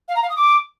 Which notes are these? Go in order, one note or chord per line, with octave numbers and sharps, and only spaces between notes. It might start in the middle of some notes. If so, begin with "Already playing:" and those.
F5
A#5
F5
D#6
D6